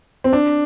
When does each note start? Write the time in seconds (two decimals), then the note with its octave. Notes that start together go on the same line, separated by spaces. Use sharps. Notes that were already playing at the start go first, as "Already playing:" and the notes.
0.24 C4
0.33 D4